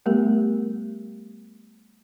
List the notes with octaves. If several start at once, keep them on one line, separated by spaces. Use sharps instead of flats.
G3 A3 B3 G4 A#4